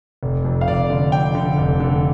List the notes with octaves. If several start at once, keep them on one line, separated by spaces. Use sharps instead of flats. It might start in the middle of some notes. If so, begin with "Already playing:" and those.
F1
F2
F5
F1 D5
D3
F2 G5
D3
F1
D3